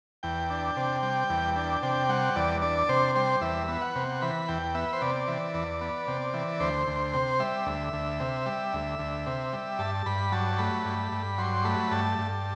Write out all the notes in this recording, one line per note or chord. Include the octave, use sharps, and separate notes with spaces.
E2 G5
D4
C3
G3
E2
D4
C3 G5
G3 F#5
E2 D5
D4 D5
C3 C5
G3 C5
E2 E5
B3
F#5
C3
E3 B5
E2 G5
B3 E5
C5
C3 D5
E3
E2
B3
C3
E3
D2 C5
D2
C3
G3 E5
D2
D2
C3
G3
D2
D2
C3
G3
G2 A5
G2 B5
F#3 A5
A3 B5
G2
G2
F#3 C6
A3 B5
G2 A5
G2